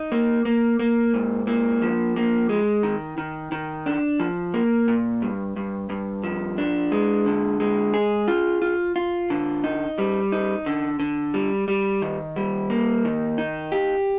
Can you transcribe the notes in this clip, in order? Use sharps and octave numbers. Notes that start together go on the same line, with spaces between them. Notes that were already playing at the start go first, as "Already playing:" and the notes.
Already playing: D#4
A#3
A#3
A#3
G#2
A#3
F3
A#3
G#3
D#3
D#3
D#3
D4
F3
A#3
A#2
G2
G2
G2
F3
D4
G#3
D3
G#3
G#4
F4
F4
F4
D3
D#4
G3
D#4
D3
D3
G3
G3
D#3
G3
A#3
D#3
D#4
G4